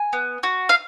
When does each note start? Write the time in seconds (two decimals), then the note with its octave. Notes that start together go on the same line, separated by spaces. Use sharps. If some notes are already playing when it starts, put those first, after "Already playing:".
Already playing: G#5
0.13 B3
0.43 F#4
0.69 F5